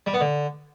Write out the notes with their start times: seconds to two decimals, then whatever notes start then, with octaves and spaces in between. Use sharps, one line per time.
0.06 G3
0.14 B3
0.21 D3